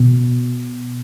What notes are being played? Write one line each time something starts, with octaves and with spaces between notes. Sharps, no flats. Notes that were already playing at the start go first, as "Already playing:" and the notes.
Already playing: B2